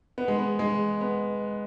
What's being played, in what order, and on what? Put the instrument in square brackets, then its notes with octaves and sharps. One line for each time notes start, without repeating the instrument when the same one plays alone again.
[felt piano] B3
G#3
B3
G#3
B3